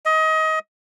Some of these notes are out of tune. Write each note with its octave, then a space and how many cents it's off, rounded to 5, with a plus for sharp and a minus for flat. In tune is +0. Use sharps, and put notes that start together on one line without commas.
D#5 +25